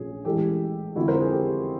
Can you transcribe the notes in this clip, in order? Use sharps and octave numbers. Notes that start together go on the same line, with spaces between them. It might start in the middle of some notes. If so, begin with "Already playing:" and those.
Already playing: A#1 A#2 F3 A3 C#4 G#4
A1 A2 E3 G#3 G4 A4
F2 D3 F3 G#3 C4 E4 F#4
A#4 C5
G#4 A#4
G4 A4